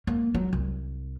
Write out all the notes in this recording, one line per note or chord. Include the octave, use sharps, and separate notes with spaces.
A#3
F#3
C2